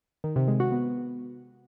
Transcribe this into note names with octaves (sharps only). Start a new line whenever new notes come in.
D#3
C3
G#3
F#4
B3